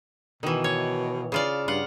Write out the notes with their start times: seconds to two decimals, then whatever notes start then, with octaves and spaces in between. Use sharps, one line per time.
0.43 B2 D#3 E3
0.64 C#5
1.32 C#3 F4 D5
1.68 G2 F4 F#5